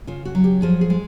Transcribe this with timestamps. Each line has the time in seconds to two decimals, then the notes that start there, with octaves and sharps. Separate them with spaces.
0.07 C#3 F4
0.25 F#4
0.35 F#3
0.44 G4
0.62 F3 G#4
0.81 G#4
0.90 G#3